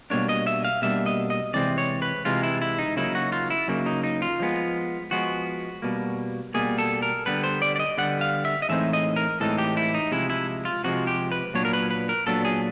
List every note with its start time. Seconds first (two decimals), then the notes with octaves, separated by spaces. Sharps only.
0.10 B2 G3 A#3 D4 C#5
0.29 D#5
0.47 E5
0.65 F5
0.82 B2 G3 A#3 D4 E5
1.06 D#5
1.30 D#5
1.54 C3 E3 G#3 C4 D5
1.78 C#5
2.02 B4
2.25 C3 E3 G#3 C4 F4
2.43 E4
2.62 E4
2.79 D#4
2.96 C#3 F#3 A#3 D#4 E4
3.15 F#4
3.32 F4
3.50 E4
3.68 C#3 F#3 A#3 D#4
3.86 D#4
4.04 D#4
4.22 F4
4.40 F3 G#3 B3
5.11 F3 G#3 B3 F#4
5.82 B2 G3 A#3
6.54 B2 G3 A#3 G#4
6.78 A4
7.02 A#4
7.26 D3 G3 B3 B4
7.44 C5
7.62 D5
7.76 D5
7.79 D#5
7.98 D3 G3 B3 F#5
8.21 F5
8.45 E5
8.62 D#5
8.69 A2 E3 G#3 C4 D#4 E5
8.93 D#5
9.16 A#4
9.40 A2 E3 G#3 C4 D#4 A4
9.58 G4
9.77 E4
9.94 D#4
10.12 C3 F3 G#3 E4
10.30 E4
10.65 F4
10.84 C3 F3 G#3 F#4
11.07 G4
11.32 B4
11.54 A#2 F#3 B3 D4 C#5
11.65 A#4
11.73 B4
11.91 B4
12.09 A#4
12.27 A#2 F#3 B3 D4 A4
12.45 G#4